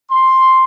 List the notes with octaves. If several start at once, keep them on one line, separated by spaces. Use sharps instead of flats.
C6